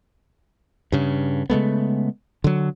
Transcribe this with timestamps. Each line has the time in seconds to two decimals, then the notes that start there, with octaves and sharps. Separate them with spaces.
0.92 G2 C#3
1.50 C#3 G#3 A3 B3
2.44 D3 F#3